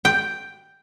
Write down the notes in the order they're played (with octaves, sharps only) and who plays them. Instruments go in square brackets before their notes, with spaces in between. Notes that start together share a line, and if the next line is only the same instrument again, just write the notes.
[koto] G5